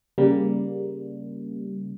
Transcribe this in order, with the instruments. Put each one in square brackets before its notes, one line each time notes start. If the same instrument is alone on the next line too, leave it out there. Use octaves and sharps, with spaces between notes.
[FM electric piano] C#3 G3 A#3